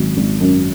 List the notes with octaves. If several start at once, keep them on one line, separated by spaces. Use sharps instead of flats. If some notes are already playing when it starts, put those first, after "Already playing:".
Already playing: G#1 F#3
G#1
F#2